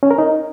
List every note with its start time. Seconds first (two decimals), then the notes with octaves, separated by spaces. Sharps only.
0.03 C#4
0.11 A#4
0.18 D#4